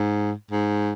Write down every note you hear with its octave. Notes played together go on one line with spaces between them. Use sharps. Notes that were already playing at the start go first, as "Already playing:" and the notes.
Already playing: G#2
G#2